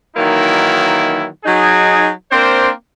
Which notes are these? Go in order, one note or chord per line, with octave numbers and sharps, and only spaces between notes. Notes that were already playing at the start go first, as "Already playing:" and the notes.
D#3 E3 F#3 A#3 D#4 E4
F#3 D#4 G#4
A#3 C4 D4 A#4 C5